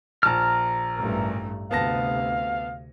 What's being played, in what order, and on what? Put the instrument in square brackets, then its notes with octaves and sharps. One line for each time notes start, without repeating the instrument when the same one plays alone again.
[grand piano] A#1 A5 [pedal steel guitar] A#5 F6
[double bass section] A1 G2 A3 [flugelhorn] A#4
[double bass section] D2 C3 [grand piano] B3 A5 A#6 [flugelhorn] F5